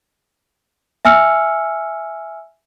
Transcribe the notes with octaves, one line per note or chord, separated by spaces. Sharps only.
E5 G#5 E6 F6 C#7